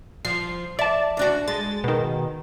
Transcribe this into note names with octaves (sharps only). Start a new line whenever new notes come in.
F3 C7
D5 E5 A5
D2 D4 F#4
G#3 A6
B2 D#3